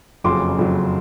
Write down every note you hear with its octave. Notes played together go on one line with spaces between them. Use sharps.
F#1 F2 C#3 F#3 C6 D6
F#1 F2 C#3 F#3